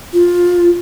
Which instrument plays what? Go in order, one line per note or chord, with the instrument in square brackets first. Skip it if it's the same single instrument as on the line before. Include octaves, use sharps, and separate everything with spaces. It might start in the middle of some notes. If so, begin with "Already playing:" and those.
[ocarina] F4